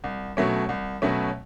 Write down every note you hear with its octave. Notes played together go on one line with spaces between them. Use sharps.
C2
B2 F#3 A3 C#4
C2
B2 F#3 A3 C#4